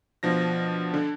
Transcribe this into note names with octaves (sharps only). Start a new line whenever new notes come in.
B2 F3 D4 A#6
D3 D4